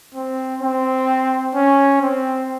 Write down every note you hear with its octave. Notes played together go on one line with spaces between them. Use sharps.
C4
C4
C#4
C4